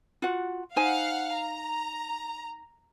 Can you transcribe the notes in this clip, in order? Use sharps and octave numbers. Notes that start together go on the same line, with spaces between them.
F4 F#4 F#5
D#4 C5 F5 F#5 G#5
A#5